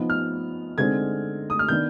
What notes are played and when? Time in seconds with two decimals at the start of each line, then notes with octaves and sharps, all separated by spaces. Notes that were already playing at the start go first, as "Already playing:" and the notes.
Already playing: F3 B3 D#4
0.10 F6
0.78 D3 G#3 C4 D#4 G#6
1.50 D#6
1.59 F6
1.68 D#3 B3 D4 G6